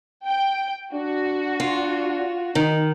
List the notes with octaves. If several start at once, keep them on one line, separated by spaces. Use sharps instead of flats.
G5
D4 F#4
F4
D#3 D#4